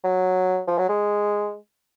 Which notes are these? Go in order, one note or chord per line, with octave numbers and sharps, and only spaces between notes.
F#3
F3
F#3
G#3